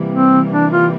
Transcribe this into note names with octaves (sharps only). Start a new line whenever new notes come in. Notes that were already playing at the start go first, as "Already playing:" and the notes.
Already playing: C3 E3 G3 A#3
C4
D4
F4